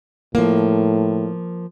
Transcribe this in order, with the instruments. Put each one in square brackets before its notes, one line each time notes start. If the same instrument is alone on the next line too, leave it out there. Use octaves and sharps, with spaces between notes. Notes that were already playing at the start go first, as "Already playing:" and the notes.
[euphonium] A2 [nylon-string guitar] F3 A#3